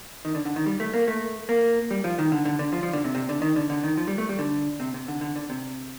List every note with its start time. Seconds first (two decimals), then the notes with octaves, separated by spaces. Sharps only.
0.25 D#3
0.35 D3
0.45 D3
0.56 D#3
0.66 G3
0.80 A3
0.94 A#3
1.08 A3
1.49 A#3
1.91 G3
2.04 F3
2.19 D#3
2.32 D3
2.45 D3
2.59 D3
2.73 F3
2.83 F3
2.93 D3
3.05 C3
3.15 C3
3.29 D3
3.42 D#3
3.56 D3
3.70 D3
3.83 D#3
3.97 F3
4.08 G3
4.18 A3
4.29 G3
4.39 D3
4.80 C3
4.94 C3
5.08 D3
5.21 D3
5.36 D3
5.50 C3